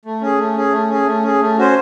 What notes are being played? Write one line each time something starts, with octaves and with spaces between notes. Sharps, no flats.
A3
C#4 G#4
A3
C#4 G#4
A3
C#4 G#4
A3
C#4 G#4
A3
C#4 F#4 C5